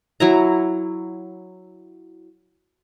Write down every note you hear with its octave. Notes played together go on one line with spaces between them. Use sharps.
F#3 E4 A#5